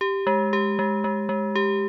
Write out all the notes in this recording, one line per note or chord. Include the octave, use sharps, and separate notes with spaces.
G4
G#3
G4
G#3
G#3
G#3
G4